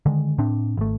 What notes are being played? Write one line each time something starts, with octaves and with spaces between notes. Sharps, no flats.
D3 D#3 G#3
A2 C4 D4
G#1 A3